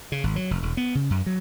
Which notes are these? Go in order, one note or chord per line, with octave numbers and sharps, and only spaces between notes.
C#3
G#1
F#3
F1
E1
B3
C#3
F#2
F#3